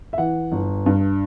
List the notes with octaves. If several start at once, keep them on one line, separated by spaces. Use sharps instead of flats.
E5
E3 F#5
G1
G2